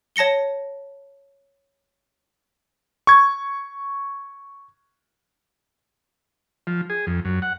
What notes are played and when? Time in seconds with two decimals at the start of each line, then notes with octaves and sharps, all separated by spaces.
0.16 C#5 A5 A#6 C#7 G7
3.07 C#6 G#6
6.67 F3
6.90 G#4
7.07 F2
7.25 F#2
7.42 F#5